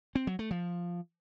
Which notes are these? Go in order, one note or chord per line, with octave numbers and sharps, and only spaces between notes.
C4
F#3
A3
F3